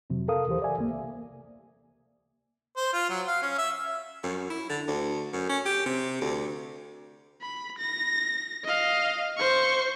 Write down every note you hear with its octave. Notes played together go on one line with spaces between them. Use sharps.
F2 C3 F#3
A4 A#4 F5 D#6
D#2 E3 G4 C5
D5 E5 G#5
C2 A#3
C5
F4
F#3
F5
C#4
E5
F#2
E4
D3
D2
F#2
C#4
G4
C3
D2
B5
A#6
D#5 F5
C5 C#6